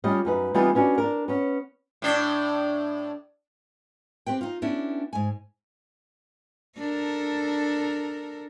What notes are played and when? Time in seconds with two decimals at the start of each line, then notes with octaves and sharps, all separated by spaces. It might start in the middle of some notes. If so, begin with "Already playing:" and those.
0.04 G3 C#4 F4 D#5
0.25 F#2 D#4 B4
0.54 E3 G3 B3 C4 D#4 F4
0.75 B3 C#4 D4 F#4
0.98 D4 A#4
1.28 B3 C#4
2.02 A2 D4
4.26 C4 G4 B4 G5
4.41 D#4 F4
4.62 B3 C#4 D4 E4 G4
5.13 G#2 G#5
6.77 D4 A4 A#4